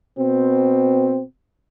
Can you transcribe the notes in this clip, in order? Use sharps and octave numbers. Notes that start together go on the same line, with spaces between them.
B2 C4